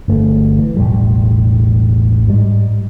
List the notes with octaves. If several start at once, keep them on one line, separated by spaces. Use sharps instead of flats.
G1 A3
E3
E1 A1 G3
G#2 G3